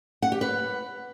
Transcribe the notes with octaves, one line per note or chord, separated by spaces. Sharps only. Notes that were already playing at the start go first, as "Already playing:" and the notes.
F#5
G4
B4